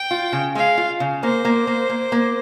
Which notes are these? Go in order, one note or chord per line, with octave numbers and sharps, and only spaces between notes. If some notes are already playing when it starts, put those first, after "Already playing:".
Already playing: G5
F4
C#3
G#3 F5
F4
C#3
A#3 C5
A#3
A#3
A#3
A#3